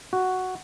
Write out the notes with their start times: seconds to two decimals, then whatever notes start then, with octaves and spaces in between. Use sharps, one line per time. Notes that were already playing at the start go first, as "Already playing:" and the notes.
0.13 F#4